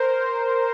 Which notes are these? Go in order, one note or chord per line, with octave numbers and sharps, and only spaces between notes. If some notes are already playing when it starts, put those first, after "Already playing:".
Already playing: A#4 C5